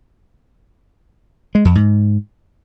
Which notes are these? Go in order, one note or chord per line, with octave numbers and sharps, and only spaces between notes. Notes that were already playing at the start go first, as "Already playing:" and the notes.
G#3
F2
G#2